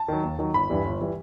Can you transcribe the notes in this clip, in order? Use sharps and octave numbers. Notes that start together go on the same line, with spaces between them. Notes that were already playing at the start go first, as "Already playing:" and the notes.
Already playing: A5
D#3 F#3
D#2
D#3 F#3
G1 B5
G2 E3 G3
G1
E3 G3